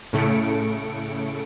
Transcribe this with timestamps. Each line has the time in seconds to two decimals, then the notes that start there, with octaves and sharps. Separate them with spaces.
0.13 A2 C#3 A3 C#7 D7